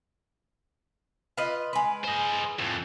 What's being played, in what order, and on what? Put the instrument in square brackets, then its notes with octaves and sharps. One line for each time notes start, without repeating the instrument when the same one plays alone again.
[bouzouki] F4 B4 D#5
G#3 B4
[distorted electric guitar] C5 D#5
F2 A2